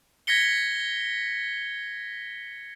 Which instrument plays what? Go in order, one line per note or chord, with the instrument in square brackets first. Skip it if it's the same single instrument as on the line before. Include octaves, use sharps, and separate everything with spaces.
[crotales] G#6 A#6 B6 C#7 G7